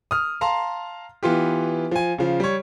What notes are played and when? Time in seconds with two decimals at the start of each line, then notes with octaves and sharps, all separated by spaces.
0.11 D#6 F6
0.41 F5 A5 A#5 C6
1.23 E3 B3 F4 G4
1.91 F3 G#5
2.18 C#3 F3
2.40 G3 C#5